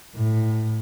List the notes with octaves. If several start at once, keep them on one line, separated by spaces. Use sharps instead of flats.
A2